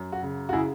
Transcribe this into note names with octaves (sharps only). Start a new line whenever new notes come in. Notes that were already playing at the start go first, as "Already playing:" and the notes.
Already playing: F#2
F#4
C#3
F#4
C#3 E4 G#4